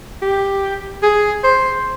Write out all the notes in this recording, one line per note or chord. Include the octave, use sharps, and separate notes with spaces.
G4
G#4
C5